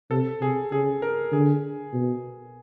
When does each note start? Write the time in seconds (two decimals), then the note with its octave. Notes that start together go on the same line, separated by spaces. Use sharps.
0.11 C3 A4
0.41 C3 G#4
0.72 C#3 G#4
1.02 A#4
1.32 D3 G#4
1.93 B2